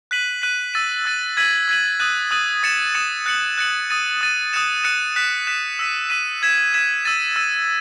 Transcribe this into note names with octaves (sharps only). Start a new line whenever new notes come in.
F#6 B6 D#7 F#7
F#6 B6 D#7 F#7
E6 A6 D#7
E6 A6 D#7
E6 G#6 B6 D#7 F#7
E6 G#6 B6 D#7 F#7
D#6 F#6 A6 D#7 F#7
D#6 F#6 A6 D#7 F#7
D#6 A6 C#7 E7
D#6 A6 C#7 E7
F#6 A6 C#7 F#7
F#6 A6 C#7 F#7
D#6 A6 D#7
D#6 A6 D#7
D#6 F#6 A6 C#7 E7
D#6 F#6 A6 C#7 E7
F#6 B6 E7
F#6 B6 E7
E6 B6 D#7
E6 B6 D#7
E6 G#6 B6 E7
E6 G#6 B6 E7
E6 A6 D#7
E6 A6 D#7